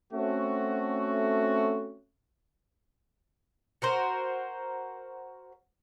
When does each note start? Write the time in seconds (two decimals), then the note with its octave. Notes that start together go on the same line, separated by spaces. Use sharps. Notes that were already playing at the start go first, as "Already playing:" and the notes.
0.13 A3 C4 C#4 F#4
3.82 F#4 A#4 C5